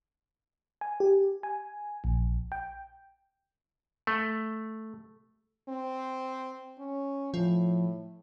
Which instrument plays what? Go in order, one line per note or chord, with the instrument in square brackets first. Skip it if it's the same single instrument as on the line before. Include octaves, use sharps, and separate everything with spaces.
[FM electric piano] G#5
G4
G#5
A#1
G5
[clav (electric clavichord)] A3
[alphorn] C4
C#4
[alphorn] A2 [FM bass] F3